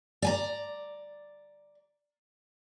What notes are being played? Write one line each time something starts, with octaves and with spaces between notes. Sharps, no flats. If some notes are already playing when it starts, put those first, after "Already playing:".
D5 G#5 A#5